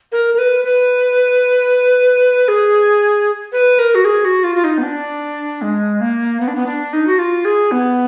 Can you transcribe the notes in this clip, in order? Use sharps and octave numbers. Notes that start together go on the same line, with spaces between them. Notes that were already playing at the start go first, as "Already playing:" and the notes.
A#4
A#4
B4
B4
G#4
B4
A#4
F#4
G#4
F#4
F4
F4
D#4
B3
D4
G#3
A#3
B3
D4
B3
D4
D#4
F#4
F4
G#4
B3